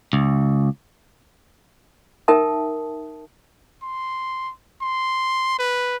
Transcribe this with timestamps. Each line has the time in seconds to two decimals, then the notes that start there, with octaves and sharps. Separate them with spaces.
0.13 C#2
2.28 D#4 A#4 E5 G5 A5 D#6
3.83 C6
4.82 C6
5.59 B4